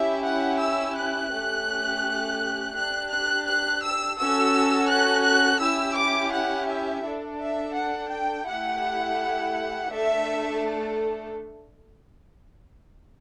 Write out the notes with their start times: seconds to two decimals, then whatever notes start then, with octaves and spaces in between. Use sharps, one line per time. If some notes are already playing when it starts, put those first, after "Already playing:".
Already playing: C#4 E4 G4 E5
0.24 F#5
0.60 E6
0.96 F#6
1.32 A3 C#4 G4
2.75 D4 G4 F#6
3.11 F#6
3.47 F#6
3.82 E6
4.18 C#4 F#4 A4 E6
4.89 F#6
5.25 F#6
5.60 C#4 E4 G4 E6
5.96 D6
6.32 F#5
6.68 E5
7.03 D4 A4
7.39 E5
7.75 F#5
8.10 G5
8.46 A3 E4 G4 F#5
9.89 A3 D4 A4 E5